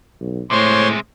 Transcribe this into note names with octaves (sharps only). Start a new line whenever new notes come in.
B1
A2 C3 G#3 C5 C#5 C6